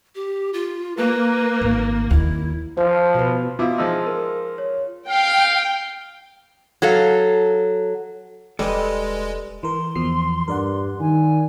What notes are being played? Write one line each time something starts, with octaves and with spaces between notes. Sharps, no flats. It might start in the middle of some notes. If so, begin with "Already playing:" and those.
G4
F4
A#3 B4
G#1
D#2 E4
F3 C5
B2 B4
B2 E4 F4 F5 D6
F3 G#3 D#4 E6
A#4
C#5
F5 G5
F#3 A4 F5
E1 G3 G#3 A4 B4 D#5
E3 A#4 C6
E2 F3 C7
G2 A#4 D5 F#5
D#3 G#5